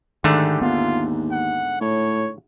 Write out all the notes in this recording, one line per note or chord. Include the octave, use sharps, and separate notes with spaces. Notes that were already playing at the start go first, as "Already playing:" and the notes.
G#2 D3 D#3 A3 G4
D#2 B3 F4
F#5
A2 C#5